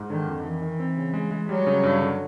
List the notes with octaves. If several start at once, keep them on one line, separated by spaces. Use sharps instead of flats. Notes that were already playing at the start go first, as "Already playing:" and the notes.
Already playing: G#2
D3 D#3
F2
D#3 E3
D#3
C4
C#3
G#3
G#3
F#3 G3
C#3
G2
D3